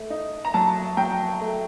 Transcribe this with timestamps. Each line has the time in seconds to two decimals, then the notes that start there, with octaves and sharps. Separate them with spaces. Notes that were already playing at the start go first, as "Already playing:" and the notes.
Already playing: A3
0.10 D#4
0.45 A#5
0.54 F#3 A5
0.97 F#3 G5
1.41 A3